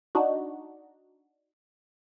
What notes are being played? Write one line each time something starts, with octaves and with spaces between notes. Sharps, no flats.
D4 D#4 F#4